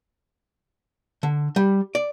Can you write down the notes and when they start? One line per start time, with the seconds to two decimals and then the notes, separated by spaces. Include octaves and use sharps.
1.23 D3
1.56 G3
1.95 D5